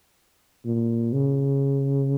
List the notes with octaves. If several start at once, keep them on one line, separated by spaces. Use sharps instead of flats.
A#2
C#3